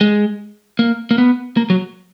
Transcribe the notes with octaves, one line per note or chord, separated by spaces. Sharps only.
G#3
A#3
A#3
B3
A#3
F#3